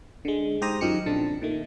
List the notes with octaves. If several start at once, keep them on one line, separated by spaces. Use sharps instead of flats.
D3 G#3
G#2 G4 C5 A#5 D#6
F#2 D#3 F3 D#4 G4 C#7
A#1 D3 C4 A5
A#2 D#3 A3